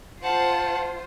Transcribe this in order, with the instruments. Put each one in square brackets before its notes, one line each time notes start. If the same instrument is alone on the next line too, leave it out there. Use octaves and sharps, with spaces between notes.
[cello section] F4 C5 [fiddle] F#5 A5